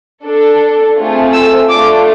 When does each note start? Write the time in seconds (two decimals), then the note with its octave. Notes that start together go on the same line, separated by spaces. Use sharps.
0.24 D4 A4
0.97 A3 C4 F4 G#4
1.33 E6
1.69 A3 D4 F4 D6